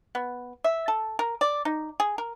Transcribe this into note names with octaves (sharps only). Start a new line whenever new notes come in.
B3
E5
A4
A#4
D5
D#4
G#4
A#4